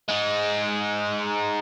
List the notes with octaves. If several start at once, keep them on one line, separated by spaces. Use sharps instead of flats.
G#3 D#4